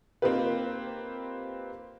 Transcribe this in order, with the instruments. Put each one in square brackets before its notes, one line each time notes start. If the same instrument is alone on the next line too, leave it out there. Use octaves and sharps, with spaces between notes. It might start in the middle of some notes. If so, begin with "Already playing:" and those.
[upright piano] A#3 C4 D#4 F4 G4 B4